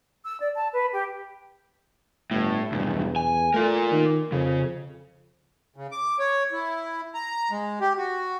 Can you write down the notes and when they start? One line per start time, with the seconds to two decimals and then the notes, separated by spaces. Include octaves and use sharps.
0.25 E6
0.39 D5
0.55 A5
0.74 B4
0.92 G4
2.31 G1 A2
2.72 B1 E2 G2
3.16 G#5
3.54 A3 F4 A#4
3.91 D#3
4.32 F2 C#3
5.76 C#3
5.92 D6
6.19 C#5
6.52 E4
7.15 A#5
7.51 G#3
7.81 G4
7.98 F#4